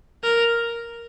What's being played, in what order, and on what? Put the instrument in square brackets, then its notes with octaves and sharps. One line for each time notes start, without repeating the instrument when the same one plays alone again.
[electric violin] A#4